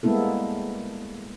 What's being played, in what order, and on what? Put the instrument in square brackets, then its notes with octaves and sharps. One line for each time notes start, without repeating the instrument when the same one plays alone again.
[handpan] G3 G#3 A#3 B3 E4 A4